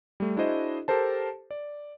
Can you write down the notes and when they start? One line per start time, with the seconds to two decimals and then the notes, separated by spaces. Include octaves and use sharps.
0.20 G3 A3
0.37 D4 E4 F#4 G#4 C5 D#5
0.88 G4 A4 A#4 C5 A5
1.51 D5